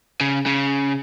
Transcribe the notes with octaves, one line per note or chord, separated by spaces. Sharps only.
C#3
C#3